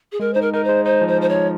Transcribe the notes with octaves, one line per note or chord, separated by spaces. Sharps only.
G#4
G#3 A#4
D#4 C5
A#4
D#4 A#4
G#3 C5
D#4 C5
F3
C5
F3 C5
C#5
F3